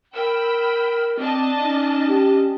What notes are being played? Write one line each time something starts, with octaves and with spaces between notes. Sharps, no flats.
A#4 G5 B5 E6
C4 D4 D#5 A5
C#4 D#4
G4